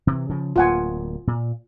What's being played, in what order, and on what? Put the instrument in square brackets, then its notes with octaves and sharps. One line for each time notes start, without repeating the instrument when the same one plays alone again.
[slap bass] C3 E3
C#3 F3
[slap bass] D1 A#3 [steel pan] F4 F#5 G#5
[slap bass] A#2